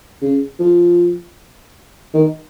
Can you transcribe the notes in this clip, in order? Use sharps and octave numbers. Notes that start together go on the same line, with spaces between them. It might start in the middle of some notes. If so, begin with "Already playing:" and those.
C#3
F3
D#3